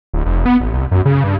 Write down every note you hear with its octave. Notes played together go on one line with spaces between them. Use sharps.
D1
F1
B3
A1
C2
F#2
C#3
G2